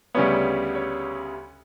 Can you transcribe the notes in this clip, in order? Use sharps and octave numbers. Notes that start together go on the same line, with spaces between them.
D2 C#3 G3 B3 C#5
C#5